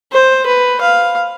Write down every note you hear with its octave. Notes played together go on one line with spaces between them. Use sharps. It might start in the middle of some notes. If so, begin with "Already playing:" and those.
C5
B4
F5